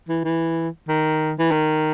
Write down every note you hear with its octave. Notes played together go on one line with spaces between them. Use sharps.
E3
E3
D#3
E3
D#3